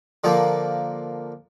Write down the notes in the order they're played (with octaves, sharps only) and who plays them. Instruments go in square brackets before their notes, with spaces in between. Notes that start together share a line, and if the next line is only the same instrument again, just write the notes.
[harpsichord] D3 F3 A#3